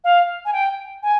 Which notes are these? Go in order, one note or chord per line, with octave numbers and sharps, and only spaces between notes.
F5
G#5
G5
G#5